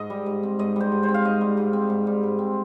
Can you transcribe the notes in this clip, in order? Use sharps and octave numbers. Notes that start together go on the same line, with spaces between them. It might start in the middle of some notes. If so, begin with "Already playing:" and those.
Already playing: G#2 D#5
G3
G#2
C4
G#2 D#5
G3 C5
G#2
C5
C4
F5
G#2 D#5
G3
G#2
C4
G#2
G3
G#2
C4